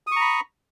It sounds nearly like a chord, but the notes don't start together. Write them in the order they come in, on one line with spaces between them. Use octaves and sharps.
D#6 C#6 A#5 B5